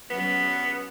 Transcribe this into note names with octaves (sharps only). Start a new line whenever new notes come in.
F#3 B3 C#4